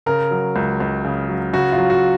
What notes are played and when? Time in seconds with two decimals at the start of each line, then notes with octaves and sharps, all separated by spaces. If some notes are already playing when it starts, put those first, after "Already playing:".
0.06 C#3 A#4
0.31 F#3
0.56 C#2
0.80 C#2
1.05 C#3
1.29 F#3
1.53 C#3 F#4
1.72 F4
1.78 F#3
1.90 F#4